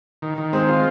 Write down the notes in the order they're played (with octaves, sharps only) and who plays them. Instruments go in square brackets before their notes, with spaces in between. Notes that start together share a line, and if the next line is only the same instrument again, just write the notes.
[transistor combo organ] D#3
D#3
[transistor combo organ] G#3 [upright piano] C4
[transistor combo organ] F4